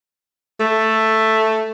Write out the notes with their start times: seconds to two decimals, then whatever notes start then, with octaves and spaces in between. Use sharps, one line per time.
0.60 A3